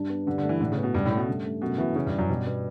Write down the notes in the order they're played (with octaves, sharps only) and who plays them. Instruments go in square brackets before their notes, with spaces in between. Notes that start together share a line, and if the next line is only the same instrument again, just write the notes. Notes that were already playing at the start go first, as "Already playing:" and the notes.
Already playing: [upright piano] G2 D4
B3
[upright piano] G2 [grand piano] D3
[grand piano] D3
[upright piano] A3
[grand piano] E3
[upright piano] A2 [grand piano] D3
[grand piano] C#3
[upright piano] B3
[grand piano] B2
[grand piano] G2 [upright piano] C#3
[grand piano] A2
[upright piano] A3
[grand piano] B2
[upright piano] G2
A3
[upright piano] F#2 [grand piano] B2
[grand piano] B2 [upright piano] E3
[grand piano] C#3 [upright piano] E3
[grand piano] G2
[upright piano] C#4
[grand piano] F#2
[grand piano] G2 [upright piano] B2
[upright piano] B3